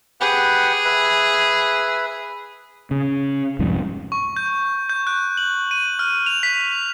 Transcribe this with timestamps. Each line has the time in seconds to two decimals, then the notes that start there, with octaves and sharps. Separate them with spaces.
0.21 G4 G#4 B4 F#5
0.85 B4 E5
2.91 C#3
3.59 C2 F2 G#2
4.12 C#6
4.36 G6
4.89 G6
5.07 F#6
5.37 F#7
5.71 D#7
5.99 F6
6.26 F7
6.43 B6